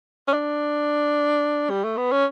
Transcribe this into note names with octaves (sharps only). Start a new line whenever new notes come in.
C#4
D4
G3
A3
B3
C#4